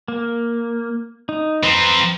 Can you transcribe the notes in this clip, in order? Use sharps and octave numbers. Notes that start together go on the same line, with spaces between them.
A#3
D#4
F3 C4 B4 C5 A#5